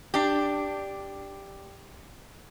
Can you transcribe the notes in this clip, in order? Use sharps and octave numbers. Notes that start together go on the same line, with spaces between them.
D4 G4